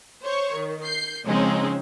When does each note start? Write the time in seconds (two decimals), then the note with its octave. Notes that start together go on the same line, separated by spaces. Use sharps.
0.23 C5 C#5 C#6
0.55 D#3
0.85 G6 C7
1.26 C#3 F3 G#3 C4 C#4 D#4